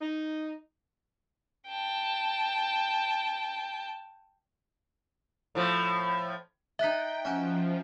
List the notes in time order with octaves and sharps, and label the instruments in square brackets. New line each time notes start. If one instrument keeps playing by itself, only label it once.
[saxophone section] D#4
[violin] G5 A5
[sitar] A2 F3
[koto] D#4 D#5 [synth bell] E5 F#6 B6 [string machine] G5
[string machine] F3 [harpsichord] C#4 F#4